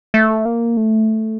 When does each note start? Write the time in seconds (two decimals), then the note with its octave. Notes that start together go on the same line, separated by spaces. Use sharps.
0.14 A3
0.45 A#3
0.77 A3